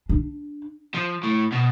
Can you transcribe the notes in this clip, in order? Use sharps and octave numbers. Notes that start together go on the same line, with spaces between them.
D4
F3
A2
B2